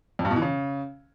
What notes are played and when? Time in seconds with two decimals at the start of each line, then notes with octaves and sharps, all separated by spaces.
0.19 F2
0.25 G2
0.31 B2
0.36 E3
0.42 C#3